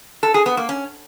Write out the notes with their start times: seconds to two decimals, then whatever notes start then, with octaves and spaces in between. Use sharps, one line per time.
0.23 A4
0.34 G#4
0.46 B3
0.57 A#3
0.69 C#4